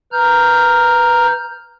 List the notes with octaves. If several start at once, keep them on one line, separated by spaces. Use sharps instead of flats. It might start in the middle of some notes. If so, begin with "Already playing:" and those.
B4 A#5 F6 G6